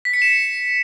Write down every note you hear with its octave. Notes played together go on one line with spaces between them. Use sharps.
B6
C#7
E7